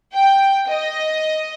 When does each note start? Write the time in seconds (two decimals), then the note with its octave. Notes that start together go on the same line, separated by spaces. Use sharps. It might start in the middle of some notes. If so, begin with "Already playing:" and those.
0.13 G5
0.68 D#5